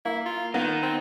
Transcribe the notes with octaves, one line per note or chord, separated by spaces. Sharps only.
A#3 E4
F4
A#3 B3 D#4 A#4
C4